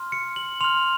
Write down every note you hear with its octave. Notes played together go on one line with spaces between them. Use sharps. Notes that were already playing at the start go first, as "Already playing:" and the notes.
Already playing: C6 F6
C#7
F#7
C6 F6 F7